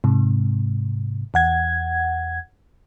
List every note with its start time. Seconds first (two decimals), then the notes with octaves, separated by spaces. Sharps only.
0.04 G#2 C3
1.34 E2 F#5 G#6